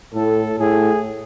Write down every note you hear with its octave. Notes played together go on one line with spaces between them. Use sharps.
A2 A4
A2 G#4